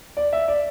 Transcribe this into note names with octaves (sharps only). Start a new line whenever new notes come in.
D5
E5
D5